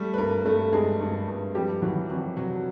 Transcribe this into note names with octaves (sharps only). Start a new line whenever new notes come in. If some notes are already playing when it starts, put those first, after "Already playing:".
Already playing: G3 A3 A4
B4
G2 A#3 A#4
G2 A3 A4
G2 G#3 G#4
G2
G2
F2 G3 G4
E3 F#3 F#4
F2 F#3 F#4
C3 F#3 F#4